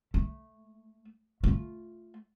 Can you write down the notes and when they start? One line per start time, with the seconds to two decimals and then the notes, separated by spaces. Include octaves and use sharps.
0.14 A3
1.44 A3 F4